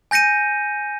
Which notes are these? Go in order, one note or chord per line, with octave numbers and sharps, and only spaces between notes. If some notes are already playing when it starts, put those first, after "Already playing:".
G#5 G6 A#6 C#7 D#7